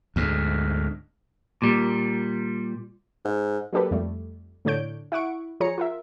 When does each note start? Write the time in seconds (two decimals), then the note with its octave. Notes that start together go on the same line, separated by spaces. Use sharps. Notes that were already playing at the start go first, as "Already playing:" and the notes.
0.16 D2 G#2
1.62 A#2 G3
3.25 G#2
3.73 F#3 A#3 D4 G4 A4 B4
3.91 F2 G3 A3
4.65 A2 D3 D4 C#5 G6 D7
5.12 E4 F#5 C#6 D7
5.60 F3 G#4 C#5 A#5 C#7
5.78 F4 A#4 E5